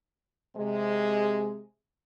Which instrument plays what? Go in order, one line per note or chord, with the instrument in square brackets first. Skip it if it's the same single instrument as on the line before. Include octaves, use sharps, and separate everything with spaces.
[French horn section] C3 G#3